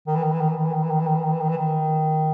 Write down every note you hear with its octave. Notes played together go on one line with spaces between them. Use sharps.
D#3
E3
D#3
E3
D#3
E3
D#3
E3
D#3
E3
D#3
E3
D#3
E3
D#3
E3
D#3
E3
D#3